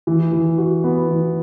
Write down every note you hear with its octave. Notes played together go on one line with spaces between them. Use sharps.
E3
E3
F#4
B3
E3